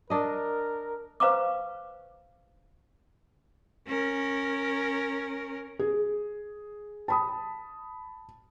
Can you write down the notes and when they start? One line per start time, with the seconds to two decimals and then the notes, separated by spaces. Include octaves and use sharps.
0.10 D4 A#4 D#5
1.20 B4 C5 F5 A#5 C#6 D6
3.87 C#4 A#4
5.79 G#4
7.08 A5 B5 D#6